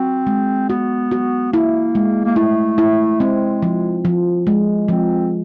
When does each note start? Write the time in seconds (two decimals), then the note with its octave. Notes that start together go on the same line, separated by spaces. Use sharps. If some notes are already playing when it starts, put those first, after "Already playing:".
Already playing: C4 F#4
0.27 G#3
0.69 B3 F#4
1.11 F#4
1.52 A#3 E4
1.95 G#3
2.25 A#3
2.36 A3 E4
2.78 E4
3.20 G#3 C4
3.63 F3
4.05 F3
4.47 G#3
4.88 F3 C4